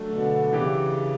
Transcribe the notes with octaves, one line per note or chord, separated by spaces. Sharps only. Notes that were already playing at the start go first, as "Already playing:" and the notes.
Already playing: F#3 A3 D4 A4
B2 D3
C#3 E3 B3 D4 G4